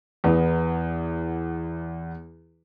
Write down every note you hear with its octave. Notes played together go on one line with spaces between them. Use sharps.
E2 B3